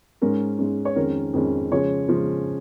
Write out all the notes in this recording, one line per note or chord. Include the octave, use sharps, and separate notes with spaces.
G#2 G#3 C#4 A#4
G#2 G#3 C#4
C#5
F2 D#3 G#3 C#4 A#4
F2 D#3 G#3 C#4
C#3 F3 G#3 C#4 C#5
C#3 F3 G#3 C#4